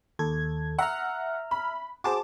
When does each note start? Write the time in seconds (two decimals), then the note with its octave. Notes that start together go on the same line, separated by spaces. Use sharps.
0.19 D#2 A4 G#6
0.79 E5 F#5 A#5 F6
1.51 B5
2.04 F#4 G#4 C5 A5 D6